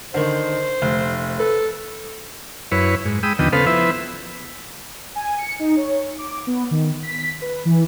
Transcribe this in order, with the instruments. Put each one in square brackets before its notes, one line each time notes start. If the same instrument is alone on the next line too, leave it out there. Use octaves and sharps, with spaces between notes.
[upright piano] D3 D#3 [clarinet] C5
[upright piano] F1
[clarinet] A4 [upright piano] B4
[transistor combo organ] F#2 E4 B4 C#5
G#2
G#3 G5 B5 D#6 E6
D#2 D3 F3 B3 D#5 G5
C#3 B3 A4 B4 C5 F5
F3 B3 E4 B4 C5 E5
[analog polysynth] G#5
C#7
D#4
C#5
D6
B3
D#3
B6
B4
E3